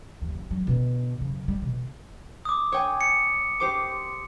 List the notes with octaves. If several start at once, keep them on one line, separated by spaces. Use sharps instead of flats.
F#1 D#2
F#3
B2 D3
F#2 C#3
G3
B2 D3
D6 D#6
C#5 G5 G#5
C#7
G4 C5 D6